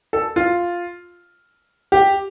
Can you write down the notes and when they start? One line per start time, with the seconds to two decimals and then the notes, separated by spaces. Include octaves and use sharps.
0.13 A4
0.36 F4
1.92 G4